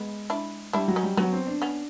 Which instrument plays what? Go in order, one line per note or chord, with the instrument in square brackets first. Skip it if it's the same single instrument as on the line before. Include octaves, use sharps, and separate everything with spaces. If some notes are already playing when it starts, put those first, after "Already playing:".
Already playing: [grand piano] G#3 [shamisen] B3
[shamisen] D4 E4
[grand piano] G3 [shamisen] D4 E4
[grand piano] F#3
[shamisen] C#4 D#4
[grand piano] G3
[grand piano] F#3 [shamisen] B3 C#4
[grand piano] C4
D4
[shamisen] B3 C#4